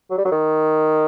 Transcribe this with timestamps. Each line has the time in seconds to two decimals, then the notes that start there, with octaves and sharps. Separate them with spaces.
0.11 F#3
0.18 G3
0.25 F#3
0.32 D#3